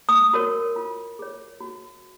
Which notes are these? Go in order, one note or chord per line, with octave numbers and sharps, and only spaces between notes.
D#6
F#4 A#4 C#5
F4
G#4 C#5
F#4